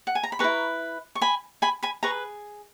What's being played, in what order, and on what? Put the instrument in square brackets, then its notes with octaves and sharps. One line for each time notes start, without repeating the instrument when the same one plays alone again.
[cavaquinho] F#5
G#5
A#5
B5
G#4 B4 A#5 C#6
E4
C#6
G#5 B5
G#5 B5
G#5 B5
G#4 B4 A#5 C#6